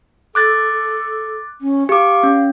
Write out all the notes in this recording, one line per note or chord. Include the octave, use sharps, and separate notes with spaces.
A4 D6 F#6 A6
C#4
G4 F5 D6
C#4